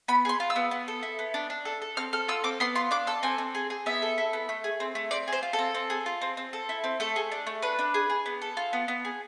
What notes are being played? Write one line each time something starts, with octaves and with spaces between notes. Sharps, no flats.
B3 B5
G#4 C6
F4
E6
B3
B3
A4
E4
B3
D4
D4
A4
A4
C4 F6
A4 F6
F4 E6
C4 D6
B3 C6
F4 C6
D4 D6
A4 E6
C4 G#5
C4
G#4
G#4
B3 E5
A4
E4
B3
A3
G#4
C4
A3
C4 D5
G#4 C5
F4
A4
C4
C4
G#4
F4
C4
C4
A4
E4
C4
A3 A4
G#4
D4
A3
D4 B4
D4
G#4
G#4
B3
A4
F4
B3
B3
G#4